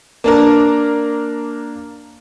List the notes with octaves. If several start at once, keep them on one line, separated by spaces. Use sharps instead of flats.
A#3 D4 A#4